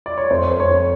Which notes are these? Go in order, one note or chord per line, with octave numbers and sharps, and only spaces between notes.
D5
C#5
F2 C5
C5
F2 C#5